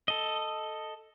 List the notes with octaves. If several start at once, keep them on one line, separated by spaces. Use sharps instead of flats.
A4 D#5